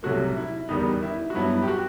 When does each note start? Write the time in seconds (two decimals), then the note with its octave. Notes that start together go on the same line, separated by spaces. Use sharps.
0.03 C2 C3 F#3 A3 F#4
0.37 E4
0.69 E2 D#3 G3 B3 D#4
1.02 E4
1.30 F#4
1.34 G2 F#3 B3 E4
1.62 G4
1.68 F#4